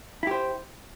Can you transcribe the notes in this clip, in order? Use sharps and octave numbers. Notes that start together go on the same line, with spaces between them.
E4 G4 C5